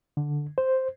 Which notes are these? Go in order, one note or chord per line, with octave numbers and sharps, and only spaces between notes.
D3
C5